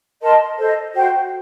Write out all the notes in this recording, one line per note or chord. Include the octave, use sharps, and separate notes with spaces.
A#4 D#5 A5 C6
A4 C5 D#5
F#4 C5 G5